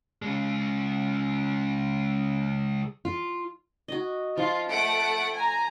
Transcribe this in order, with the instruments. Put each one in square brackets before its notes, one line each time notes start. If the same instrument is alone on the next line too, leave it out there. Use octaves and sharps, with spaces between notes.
[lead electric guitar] C#3 G#3
[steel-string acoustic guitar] F4
[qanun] F#4 D#5
[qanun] F3 [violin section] F4
[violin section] A3 F#5 D7
G#5 A#5